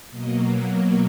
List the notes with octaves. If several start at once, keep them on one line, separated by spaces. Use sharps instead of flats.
B2 F#3 A#3 D#5